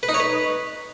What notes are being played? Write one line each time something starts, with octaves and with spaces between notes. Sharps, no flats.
B4
D#4
C#5
B4